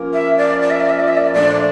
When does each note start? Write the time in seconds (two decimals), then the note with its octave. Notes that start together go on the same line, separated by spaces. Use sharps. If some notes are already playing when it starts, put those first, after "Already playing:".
Already playing: F3 A#3 C#4 F4 A#4
0.13 E5
0.37 D5
0.62 D5
0.70 E5
0.80 D5
0.89 E5
0.99 D5
1.08 E5
1.17 D5
1.34 A#2 F3 A3 D4 D5